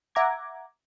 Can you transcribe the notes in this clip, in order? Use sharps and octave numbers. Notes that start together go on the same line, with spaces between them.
E5 F#5 A#5 D6 G#6